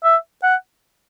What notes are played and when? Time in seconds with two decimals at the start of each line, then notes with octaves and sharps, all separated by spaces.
0.04 E5
0.43 F#5